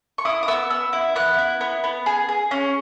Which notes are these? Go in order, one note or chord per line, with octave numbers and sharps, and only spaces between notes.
C#6
E4 D#6
D#6
B3 E6
B3 E6
E4
B3 F#6
E4
B3
B3
G#4
G#4
C#4